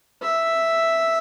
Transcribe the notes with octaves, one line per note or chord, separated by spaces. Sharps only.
E5